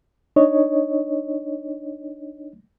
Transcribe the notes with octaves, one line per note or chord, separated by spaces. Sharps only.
D4 D#4 C#5 D#5